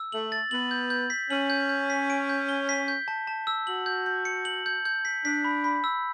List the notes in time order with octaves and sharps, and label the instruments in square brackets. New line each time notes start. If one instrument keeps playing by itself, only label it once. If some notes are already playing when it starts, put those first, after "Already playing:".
Already playing: [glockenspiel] E6
[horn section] A3 [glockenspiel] F#7
[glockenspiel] A6
[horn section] B3 [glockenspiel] F#7
[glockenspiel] G6
G6
B6
[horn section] C#4 [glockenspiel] F#7
[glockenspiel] G6
G6
B6
D7
G6
G7
B6
G6
A5
A5
E6
[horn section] F#4 [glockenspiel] F#7
[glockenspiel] G6
G6
C#7
F#7
G6
G6
B6
[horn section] D4 [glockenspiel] B6
[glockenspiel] B5
B5
E6